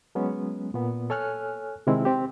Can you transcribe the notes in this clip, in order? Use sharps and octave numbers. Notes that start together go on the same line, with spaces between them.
F#3 G#3 B3 C#4
A#2 B3
A4 C#5 G#5 F6 F#6
C3 D#3 G#3 C4 E4
C4 G4